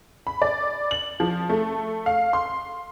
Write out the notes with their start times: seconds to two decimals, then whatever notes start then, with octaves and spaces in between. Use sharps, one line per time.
0.27 B5
0.42 D5
0.91 F#7
1.20 F3
1.49 A3
2.06 F5
2.33 C6